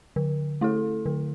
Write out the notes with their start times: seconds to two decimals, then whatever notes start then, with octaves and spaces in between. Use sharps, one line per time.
0.16 D3
0.61 A3 E4 A4
1.06 D3